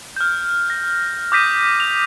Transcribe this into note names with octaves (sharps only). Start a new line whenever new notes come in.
F6 G6
A#6
D6 D#6 G6 A#6 B6 D#7
F7